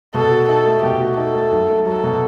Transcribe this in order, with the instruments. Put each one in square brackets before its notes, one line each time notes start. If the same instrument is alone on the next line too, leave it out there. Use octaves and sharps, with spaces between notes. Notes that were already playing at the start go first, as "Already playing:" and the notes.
[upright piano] B2 [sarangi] A4
[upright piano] F#4
[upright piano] D#4 [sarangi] A4
[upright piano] A3
[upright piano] B2 [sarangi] G4
[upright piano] F#4
[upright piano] D#4 [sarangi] A4
[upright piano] A3
B1
A3
[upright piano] F#3 [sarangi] A4
[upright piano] B2